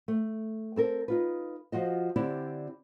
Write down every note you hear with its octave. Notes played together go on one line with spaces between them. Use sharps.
A3
C4 A4 A#4
D#4 F4 B4
F3 F4 F#4 D#5
D3 C4 E4 G4 D5